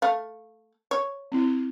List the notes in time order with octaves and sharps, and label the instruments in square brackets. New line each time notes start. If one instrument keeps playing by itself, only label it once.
[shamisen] A3 F5
C#5
[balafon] C4 E4